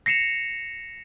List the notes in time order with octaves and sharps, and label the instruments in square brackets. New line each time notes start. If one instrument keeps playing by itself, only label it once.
[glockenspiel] A#6 C7 C#7 E7 F7